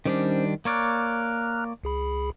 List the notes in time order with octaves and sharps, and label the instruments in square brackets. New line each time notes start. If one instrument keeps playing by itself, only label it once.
[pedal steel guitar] D#3 G3 D4 [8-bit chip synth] C#4 C5
[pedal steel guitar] A#3 C#5 D5 [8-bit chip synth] A#5 F6 F#6
[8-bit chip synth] C#2 G#4 B5